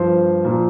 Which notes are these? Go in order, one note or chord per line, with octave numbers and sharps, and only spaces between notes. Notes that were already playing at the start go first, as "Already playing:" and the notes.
Already playing: G2 F3 C5
A#2 F3